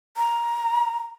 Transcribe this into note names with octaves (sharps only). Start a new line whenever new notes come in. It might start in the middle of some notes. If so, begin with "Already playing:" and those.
A#5